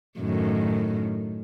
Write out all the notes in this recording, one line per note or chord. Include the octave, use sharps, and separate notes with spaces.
F#2 A2 D#3